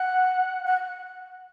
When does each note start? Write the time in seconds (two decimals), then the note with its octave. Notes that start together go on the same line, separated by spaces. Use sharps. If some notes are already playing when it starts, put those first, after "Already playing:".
Already playing: F#5
0.65 F#5